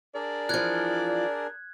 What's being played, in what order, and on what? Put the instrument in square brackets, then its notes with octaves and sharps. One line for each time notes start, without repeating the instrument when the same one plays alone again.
[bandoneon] D4 G#4 A#4 [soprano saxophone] D5
[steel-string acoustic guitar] E3 F3 [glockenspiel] F#6 G#6